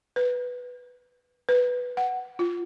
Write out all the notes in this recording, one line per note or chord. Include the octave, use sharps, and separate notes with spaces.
B4
B4
F#5
F4